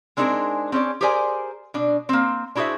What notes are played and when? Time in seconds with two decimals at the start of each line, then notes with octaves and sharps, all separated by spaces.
0.17 G#3 C4 D4 D#4 G#4 A#4
0.72 C4 C#4 G#4 D5
1.01 G4 G#4 A#4 C5 D5 G#5
1.74 B2 D4
2.09 A#3 C4
2.55 D4 E4 F#4 G#4 C5 E5